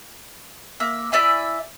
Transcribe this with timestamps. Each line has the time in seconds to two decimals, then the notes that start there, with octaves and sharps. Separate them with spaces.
0.80 A#3 E5
1.12 E4 D5 E5 G#5